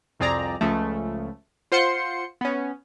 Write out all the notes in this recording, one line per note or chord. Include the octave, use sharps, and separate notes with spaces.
C2 F2 C4 G#4 D5 A#5
C#2 C#3 F3 A3
F4 C5 F#5 C6 C#7
B3 C#4